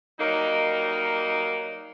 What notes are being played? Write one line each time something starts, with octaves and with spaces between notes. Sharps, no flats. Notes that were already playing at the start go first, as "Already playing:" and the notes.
F#3 G3 A#3 D#4